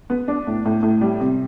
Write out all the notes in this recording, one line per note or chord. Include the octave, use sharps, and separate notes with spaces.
B3
D4
A2
A2
A2
G3
C3